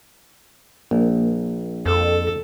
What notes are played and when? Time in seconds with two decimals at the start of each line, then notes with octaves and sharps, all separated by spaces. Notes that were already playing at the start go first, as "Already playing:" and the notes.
0.91 A#1 A#3
1.86 F2 A4